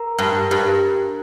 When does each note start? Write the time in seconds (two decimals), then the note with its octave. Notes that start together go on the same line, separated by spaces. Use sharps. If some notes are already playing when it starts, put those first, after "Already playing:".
Already playing: A#4 A#5
0.19 G2
0.51 G2